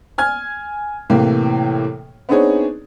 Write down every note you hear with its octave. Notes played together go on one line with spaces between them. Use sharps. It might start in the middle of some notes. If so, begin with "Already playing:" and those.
G#5 F6 G#6
A2 C3 E3 A#3
B3 C4 D4 D#4 G#4 C#5